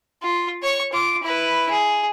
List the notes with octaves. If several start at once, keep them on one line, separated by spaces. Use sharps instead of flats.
F4
C#5 C#6
F4 D6
E4 B4
G#4